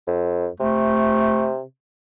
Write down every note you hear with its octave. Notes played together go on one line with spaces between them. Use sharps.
F2
C3 A3